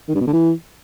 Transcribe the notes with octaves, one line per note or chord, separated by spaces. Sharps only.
D#3
G2
B2
D3
E3